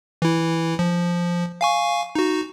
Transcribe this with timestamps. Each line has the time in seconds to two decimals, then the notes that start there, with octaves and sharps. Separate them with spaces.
0.22 E3 E4
0.79 F3
1.61 F5 G#5 C#6
2.15 D#4 F#4